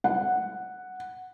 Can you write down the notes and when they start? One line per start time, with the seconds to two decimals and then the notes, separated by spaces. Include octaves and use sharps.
0.04 F#5